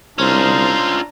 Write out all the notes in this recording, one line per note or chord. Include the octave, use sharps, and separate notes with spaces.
C2 C#4 D4 F4 C5 A#5